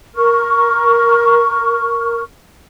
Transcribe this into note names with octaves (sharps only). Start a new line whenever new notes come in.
A#4 C#6 F6